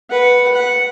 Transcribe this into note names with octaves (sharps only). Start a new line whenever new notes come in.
B4 F#5
F#5